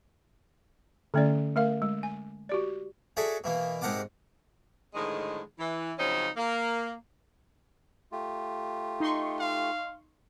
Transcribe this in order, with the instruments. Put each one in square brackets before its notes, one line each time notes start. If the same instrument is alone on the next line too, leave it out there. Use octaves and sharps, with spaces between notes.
[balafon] D3 A3 C#4 E4 D5
A3 A#4 F5
G#3
G#5
F#4 G4 D5
[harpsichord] F#4 G#4 A4 C#5 D5 E5
B2 E3 A#3
G#2 C3 A#4 F#5 A5 D6
[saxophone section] A2 D3 D#3 F3 G#3
E3
C#3 F3 F#3 C4 C#4 D#4
A#3
[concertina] A3 F4 G4
[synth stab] D#4 C6 C#6
[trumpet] F5